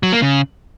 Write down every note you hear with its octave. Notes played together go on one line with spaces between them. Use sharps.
F#3
A#3
C#3